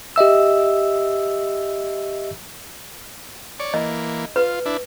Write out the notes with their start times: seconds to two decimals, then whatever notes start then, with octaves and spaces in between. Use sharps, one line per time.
0.16 G4 D#5 E5 E6
3.60 C#5 D5
3.74 E3 A#3 D#5
4.36 F4 B4
4.66 D4 E4